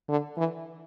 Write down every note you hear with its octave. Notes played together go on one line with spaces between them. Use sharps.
D3
E3